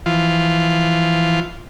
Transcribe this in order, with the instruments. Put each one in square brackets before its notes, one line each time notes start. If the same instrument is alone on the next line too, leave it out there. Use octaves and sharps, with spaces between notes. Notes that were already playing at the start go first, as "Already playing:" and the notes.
[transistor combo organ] E3 F3 F4